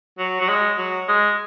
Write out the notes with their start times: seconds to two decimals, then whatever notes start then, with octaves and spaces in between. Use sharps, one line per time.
0.19 F#3
0.41 F#3
0.49 G#3
0.78 F#3
1.08 G#3